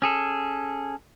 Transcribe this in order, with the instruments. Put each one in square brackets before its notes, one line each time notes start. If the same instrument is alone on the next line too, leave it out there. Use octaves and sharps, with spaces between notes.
[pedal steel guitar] C#4 G#4 A4